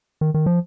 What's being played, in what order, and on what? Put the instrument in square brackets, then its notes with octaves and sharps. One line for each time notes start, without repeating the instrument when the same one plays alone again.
[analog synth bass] D#3
D#3
F3